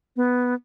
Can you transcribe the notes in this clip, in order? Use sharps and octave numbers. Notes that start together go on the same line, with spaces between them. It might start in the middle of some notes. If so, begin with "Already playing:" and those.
B3